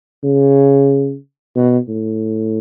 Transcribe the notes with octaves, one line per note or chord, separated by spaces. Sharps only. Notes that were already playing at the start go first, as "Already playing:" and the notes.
C#3
B2
A2